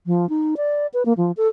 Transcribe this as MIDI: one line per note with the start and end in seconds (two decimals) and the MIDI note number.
0.06 0.28 53
0.29 0.55 63
0.57 0.87 74
0.94 1.03 71
1.05 1.13 58
1.17 1.32 53
1.37 1.48 69